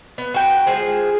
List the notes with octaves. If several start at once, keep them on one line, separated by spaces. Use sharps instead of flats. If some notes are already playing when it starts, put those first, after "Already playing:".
B3
F#4 G5
G#3 F4 G#4 C5